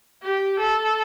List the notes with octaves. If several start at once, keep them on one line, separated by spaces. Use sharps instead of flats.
G4
A4